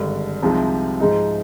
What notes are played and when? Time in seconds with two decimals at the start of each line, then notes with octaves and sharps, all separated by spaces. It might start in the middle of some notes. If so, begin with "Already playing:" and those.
Already playing: G#1 G2 D3
0.42 C2 C3 F3 G#3 D#4
1.00 G#2 F3 G#3 D#4